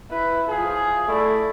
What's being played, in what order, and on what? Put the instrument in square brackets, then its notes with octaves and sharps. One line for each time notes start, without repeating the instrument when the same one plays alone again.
[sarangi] E4 [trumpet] B4
[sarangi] F3 [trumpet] G#4
[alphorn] A3 [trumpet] E4 [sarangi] D5